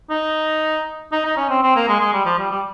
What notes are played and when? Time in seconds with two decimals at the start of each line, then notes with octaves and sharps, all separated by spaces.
0.10 D#4
1.12 D#4
1.25 D#4
1.37 C#4
1.50 C4
1.63 C4
1.76 A#3
1.88 G#3
2.00 G#3
2.13 G3
2.25 F3
2.39 G3
2.51 G3